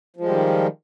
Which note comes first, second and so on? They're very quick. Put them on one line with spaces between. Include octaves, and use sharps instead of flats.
F3 G#3 G3 D#3